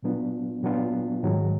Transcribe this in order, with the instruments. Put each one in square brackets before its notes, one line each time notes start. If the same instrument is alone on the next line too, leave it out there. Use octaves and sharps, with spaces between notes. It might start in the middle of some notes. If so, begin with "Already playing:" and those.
[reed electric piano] A#2 F#3 B3 D4 F4
A#2 F#3 B3 D4 F4
G#2 D#3 F#3